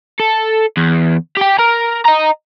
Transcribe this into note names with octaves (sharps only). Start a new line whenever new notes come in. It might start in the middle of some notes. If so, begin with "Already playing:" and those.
A4
E2
G4 G5
A#4 A#5
D#5 A#5